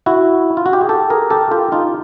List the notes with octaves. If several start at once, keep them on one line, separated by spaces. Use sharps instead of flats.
E4 F#4
F4
F#4
G4
G#4
G4 A4
G#4 A#4
G4 A4
F4 G4
D#4 F4